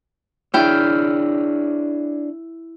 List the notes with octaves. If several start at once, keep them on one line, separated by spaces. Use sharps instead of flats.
D4 E4 G#4 C#5 G5 F6